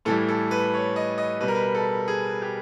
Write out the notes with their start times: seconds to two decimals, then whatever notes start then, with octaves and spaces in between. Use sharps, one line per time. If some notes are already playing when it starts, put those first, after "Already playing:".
0.05 A2 E3 G3 A4
0.29 A4
0.51 B4
0.74 C#5
0.96 D#5
1.18 D#5
1.41 B2 G3 B4
1.48 A#4
1.55 B4
1.75 A4
2.08 G#4
2.42 G4